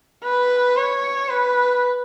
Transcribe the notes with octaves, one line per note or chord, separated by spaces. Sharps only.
B4
C#5
B4